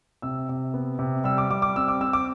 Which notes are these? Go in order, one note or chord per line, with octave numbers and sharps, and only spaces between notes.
C3 E6
C3
B3
C3
G3 E6
D6
G3 D6
D6
C4 E6
D6
C4 E6
D6